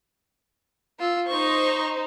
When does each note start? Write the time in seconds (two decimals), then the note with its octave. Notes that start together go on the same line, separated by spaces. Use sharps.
0.99 F4 E6
1.28 D#4 C5 C#6